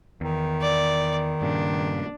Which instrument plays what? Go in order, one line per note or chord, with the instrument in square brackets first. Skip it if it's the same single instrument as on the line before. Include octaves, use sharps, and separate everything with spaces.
[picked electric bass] E2 [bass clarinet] D#3
[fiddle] D5
[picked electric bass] G2 A#2 C#3 [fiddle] D4